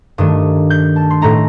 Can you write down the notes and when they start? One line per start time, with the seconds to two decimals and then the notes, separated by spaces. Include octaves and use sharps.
0.18 G2 D#3 A3 D4 D#6
0.70 G6
0.96 A5
1.10 C6
1.21 A2 A3 D#4 A#5